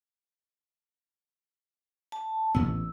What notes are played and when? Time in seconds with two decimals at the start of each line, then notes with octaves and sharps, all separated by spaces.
2.12 A5
2.55 A1 A2 B3 E6